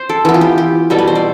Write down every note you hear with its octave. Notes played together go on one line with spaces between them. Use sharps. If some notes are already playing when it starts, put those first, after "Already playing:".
Already playing: C5
A4
E3 B3
F4
G4
G4
B2 G3 B3 A4
B4
C5
D5